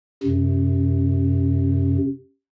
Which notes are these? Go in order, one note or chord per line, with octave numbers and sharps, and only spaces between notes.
F#2 C3